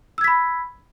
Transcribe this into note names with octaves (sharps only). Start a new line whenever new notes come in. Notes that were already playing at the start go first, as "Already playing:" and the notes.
B5 E6 G#6 B6